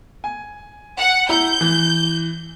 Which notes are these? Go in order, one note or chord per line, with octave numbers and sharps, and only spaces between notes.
G#5
F#5
E4 A#5 G6
E3